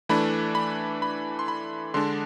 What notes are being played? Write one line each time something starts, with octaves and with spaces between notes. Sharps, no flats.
E3 A3 D4 B5
B5
B5
C6
B5
D3 G#3 D4 C6